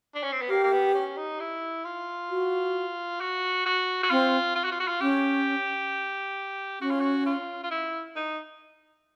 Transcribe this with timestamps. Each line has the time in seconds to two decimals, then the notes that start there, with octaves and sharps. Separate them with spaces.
0.15 D4
0.23 C#4
0.33 C4
0.42 B3
0.49 A#3 G4
0.64 A#3
0.72 B3
0.95 C#4
1.18 D#4
1.40 E4
1.85 F4
2.30 F#4
3.21 F#4
3.66 F#4
4.03 F#4
4.11 C4 F4
4.56 F4
4.64 F#4
4.72 F4
4.80 F#4
4.88 F4
5.01 C#4 G4
6.81 C#4 F#4
6.91 F4
7.01 F#4
7.26 F4
7.63 F4
7.71 E4
8.16 D#4